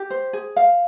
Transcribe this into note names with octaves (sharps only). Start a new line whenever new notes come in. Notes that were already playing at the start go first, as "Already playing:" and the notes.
Already playing: G4
C5
G#4
F5